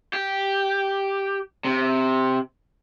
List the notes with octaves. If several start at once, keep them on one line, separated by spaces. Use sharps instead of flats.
G4
C3